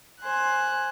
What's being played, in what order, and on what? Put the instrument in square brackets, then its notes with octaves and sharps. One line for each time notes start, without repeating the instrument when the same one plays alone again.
[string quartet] C5 G#5 F#6